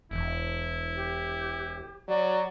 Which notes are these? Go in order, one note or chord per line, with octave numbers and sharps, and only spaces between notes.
E1 E4
G4
F#3 D5